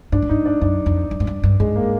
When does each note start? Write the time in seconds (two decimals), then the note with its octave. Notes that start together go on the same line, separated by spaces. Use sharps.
0.12 G#2 D4
0.22 A2
0.29 G#2 D#4
0.45 D4
0.61 F#2 D4
0.86 F2
1.11 F#2
1.20 G#2
1.27 G2
1.43 G2
1.60 G#2 G#3
1.76 A#3